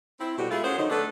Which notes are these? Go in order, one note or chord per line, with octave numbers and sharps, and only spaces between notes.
C4 E4
B2 G3 A3 F#4 G4
G#3 A3 E4 F4 G#4
C#4 F#4 G#4 A#4 C5
D3 F#3 D#4
A3 B3 D4 A4 B4